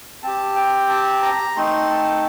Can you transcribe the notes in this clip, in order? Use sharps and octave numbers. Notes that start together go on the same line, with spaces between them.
C4 G4 A5
G5
A5
A#5
A3 C4 D#4 C6
A5